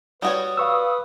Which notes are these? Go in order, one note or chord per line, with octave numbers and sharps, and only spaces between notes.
G3 F#4 B4 C#5 D#6
B4 F5 C#6 E6